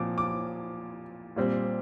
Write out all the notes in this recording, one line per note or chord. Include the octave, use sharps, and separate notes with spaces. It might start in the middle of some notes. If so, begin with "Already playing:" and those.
Already playing: A#2 F3 C4 D6
D6
A#2 G3 C4